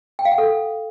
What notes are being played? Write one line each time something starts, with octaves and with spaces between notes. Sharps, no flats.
G5
F5
F#5
A4